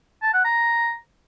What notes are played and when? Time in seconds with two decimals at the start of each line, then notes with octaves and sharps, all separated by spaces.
0.22 A5
0.33 F#5
0.45 A#5